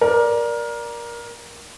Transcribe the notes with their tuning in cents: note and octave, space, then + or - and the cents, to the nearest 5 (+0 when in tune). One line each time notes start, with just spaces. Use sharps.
A#4 +20 D5 +0